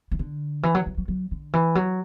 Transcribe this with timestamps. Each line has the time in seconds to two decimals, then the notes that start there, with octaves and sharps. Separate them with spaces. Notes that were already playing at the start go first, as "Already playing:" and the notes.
0.11 E3
0.19 D3
0.63 E3
0.75 F#3
0.86 F#3
0.97 F#3
1.08 F#3
1.31 D3
1.53 E3
1.75 F#3